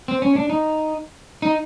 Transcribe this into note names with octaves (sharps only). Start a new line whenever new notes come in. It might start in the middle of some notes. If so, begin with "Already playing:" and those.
C4
C#4
D4
D#4
D#4